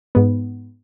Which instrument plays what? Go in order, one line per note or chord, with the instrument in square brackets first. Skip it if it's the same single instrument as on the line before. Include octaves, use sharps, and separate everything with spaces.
[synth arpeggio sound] G#2 B3